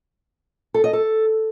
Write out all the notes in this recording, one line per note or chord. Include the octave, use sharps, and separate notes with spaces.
A4
D#5
A4